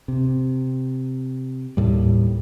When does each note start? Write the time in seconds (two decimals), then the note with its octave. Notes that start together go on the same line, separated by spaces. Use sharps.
0.08 C3
1.77 D#2 A2 G3